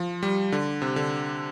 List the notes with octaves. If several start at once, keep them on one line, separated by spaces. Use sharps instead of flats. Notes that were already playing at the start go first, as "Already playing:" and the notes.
Already playing: F3
G3
D3
C3
D3